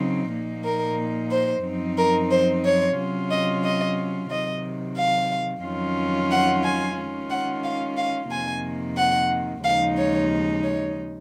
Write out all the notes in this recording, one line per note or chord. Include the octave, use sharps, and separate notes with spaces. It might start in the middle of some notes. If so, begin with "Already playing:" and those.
Already playing: C#3 F#3 C4 D#4
A#2 F3 A#3 D#4
A#4
C5
F#2 F3 C4 D#4
A#4
C5
C#5
C3 F#3 C#4 F4
D#5
D#5
C3 D#3 F#3 D#5
F5
F2 D#3 F#3 C#4 F4
F#5
G#5
D#3 G#3 C#4 F4
F#5
F5
F5
F2 C3 D#3 A#3 G#5
F#5
D#2 C#3 F3 G#3 D#4 F5
C#5
C#5